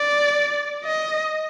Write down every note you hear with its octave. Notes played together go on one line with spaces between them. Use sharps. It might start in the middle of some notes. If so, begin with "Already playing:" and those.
Already playing: D5
D#5